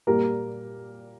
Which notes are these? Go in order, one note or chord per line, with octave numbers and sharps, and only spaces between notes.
A#2 G3 A#3 G4 A#4